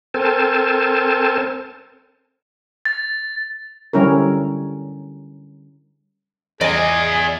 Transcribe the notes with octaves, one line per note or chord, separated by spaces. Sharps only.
C4 A4 A#4 C5 G#5 A5
A6
D3 G3 C#4 E4 A#4
E2 G#4 D5 D#5 G#5